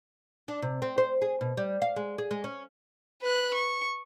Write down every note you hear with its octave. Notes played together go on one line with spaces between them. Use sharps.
D4
C3
C4
C5
G#4
B2
G3
F5
G#3
G#4
G#3
C#4
B4 F#6
C#6